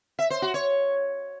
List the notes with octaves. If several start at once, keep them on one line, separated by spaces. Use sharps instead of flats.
E5
C5
F#4
C#5